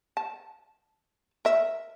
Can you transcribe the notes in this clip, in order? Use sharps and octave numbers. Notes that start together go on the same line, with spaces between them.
A5
A#4 E5